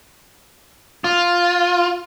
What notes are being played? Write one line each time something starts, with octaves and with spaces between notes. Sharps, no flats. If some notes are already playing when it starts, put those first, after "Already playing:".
F4